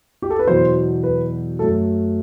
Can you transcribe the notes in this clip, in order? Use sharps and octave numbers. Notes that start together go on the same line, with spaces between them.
G4
A4
B4
E2 B2 F#3 C5
B4
F#2 F#3 A3 A4